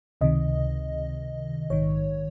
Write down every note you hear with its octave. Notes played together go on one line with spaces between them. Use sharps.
C#2 C3 D#3 D#5
A#1 G#2 D#3 C#5